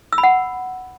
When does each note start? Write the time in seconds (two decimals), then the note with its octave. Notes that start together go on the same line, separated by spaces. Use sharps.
0.13 E6
0.18 B5
0.23 F#5